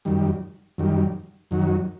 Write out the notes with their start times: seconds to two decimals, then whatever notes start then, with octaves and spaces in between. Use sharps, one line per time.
0.05 F#2 D#3 G3
0.78 F#2 D#3 G3
1.51 F#2 D#3 F#3